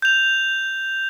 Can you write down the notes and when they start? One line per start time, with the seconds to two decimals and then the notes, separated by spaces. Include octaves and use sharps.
0.02 G6 F7